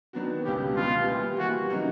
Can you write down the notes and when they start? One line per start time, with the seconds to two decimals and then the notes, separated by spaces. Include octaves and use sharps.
0.13 D#3 F#3 B3 D4 F#4
0.44 C#2 B2 G3 B3 G4
0.75 C#2 B2 G3 B3 F4
1.07 E3 G3 A#3
1.39 E3 G3 A#3 F#4
1.70 C#3 F#3 A#3 D#4